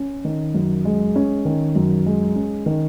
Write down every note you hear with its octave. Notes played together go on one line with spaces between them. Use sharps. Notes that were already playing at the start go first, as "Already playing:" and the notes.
Already playing: C#4
D#3
F#2
G#3
C#4
D#3
F#2
G#3
C#4
D#3